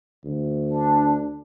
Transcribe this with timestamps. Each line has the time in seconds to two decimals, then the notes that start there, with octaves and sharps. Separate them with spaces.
0.25 D2
0.67 D4